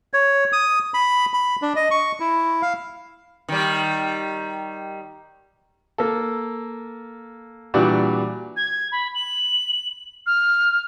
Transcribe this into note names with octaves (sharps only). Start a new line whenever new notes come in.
C#5
D#6
B5
B5
D4
D#5
C#6
E4
F5
D#3 G3
A#3 A4
A#2 E3 G3 D4 F#4
G#6
B5
F#7
F6